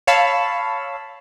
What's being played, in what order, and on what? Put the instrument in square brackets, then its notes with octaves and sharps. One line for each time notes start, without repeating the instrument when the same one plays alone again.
[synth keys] C#5 F5 A5 B5 E6